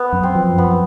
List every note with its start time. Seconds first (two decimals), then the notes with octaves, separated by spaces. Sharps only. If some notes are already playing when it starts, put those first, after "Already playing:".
Already playing: B3
0.13 F#2
0.23 C4
0.35 F3
0.57 F#2 B3